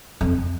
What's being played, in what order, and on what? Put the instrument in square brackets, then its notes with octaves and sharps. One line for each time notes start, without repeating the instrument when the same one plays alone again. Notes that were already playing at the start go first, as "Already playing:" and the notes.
[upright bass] F2